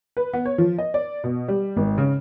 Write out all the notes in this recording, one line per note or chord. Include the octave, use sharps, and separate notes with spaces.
B4
B3
C#5
F3
D#5
D5
B2
G3
G#1
C#3